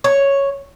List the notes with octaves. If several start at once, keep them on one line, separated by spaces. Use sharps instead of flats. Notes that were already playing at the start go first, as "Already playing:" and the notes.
C#5